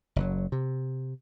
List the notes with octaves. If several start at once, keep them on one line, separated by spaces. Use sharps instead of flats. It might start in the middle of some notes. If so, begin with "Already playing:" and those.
F#1 F#3
C3